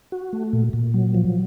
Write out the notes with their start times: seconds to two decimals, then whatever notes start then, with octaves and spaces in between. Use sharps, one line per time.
0.12 F#4
0.33 A3
0.53 A#2
0.73 A#2
0.94 F#3
1.15 F3